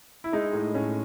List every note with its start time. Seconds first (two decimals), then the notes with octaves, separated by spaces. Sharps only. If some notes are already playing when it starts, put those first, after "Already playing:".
0.24 E4
0.32 G#3 D#4
0.53 A2
0.75 A2 C#4